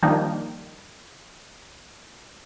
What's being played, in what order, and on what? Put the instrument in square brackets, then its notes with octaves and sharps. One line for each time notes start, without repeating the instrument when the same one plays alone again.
[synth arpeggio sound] D#3 F3 G3 A#3 D4 D#4